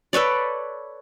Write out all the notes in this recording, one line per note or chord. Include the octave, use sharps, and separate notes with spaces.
A4 B4 C#5 D5